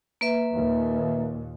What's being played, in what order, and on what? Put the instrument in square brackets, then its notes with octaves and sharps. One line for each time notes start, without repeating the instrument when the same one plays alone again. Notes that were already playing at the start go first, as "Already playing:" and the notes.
[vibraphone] A#3 B4 E5
[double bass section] D#2 A#2